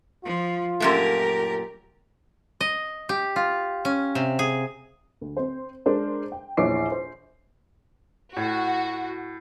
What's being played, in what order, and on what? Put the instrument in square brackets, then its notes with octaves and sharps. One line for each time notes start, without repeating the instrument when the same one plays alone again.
[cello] F3 [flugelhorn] F4
[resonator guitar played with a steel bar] F#2 A#2 A3 [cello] G4 A#4
[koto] D#5
G4
F4
C#4
C3
G#4
[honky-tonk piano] D2
C4 C5
G#3 D4 A#4 C5
G5
A#1 E2 C#5 D6 C7
C5
[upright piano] A2 [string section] F#4